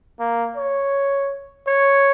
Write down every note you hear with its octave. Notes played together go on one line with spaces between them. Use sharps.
A#3
C#5
C#5